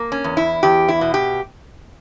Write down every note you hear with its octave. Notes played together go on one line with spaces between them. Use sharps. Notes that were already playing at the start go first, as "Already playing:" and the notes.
Already playing: A#3
C#4
E2
E4
E2 G4
E4
B2
G4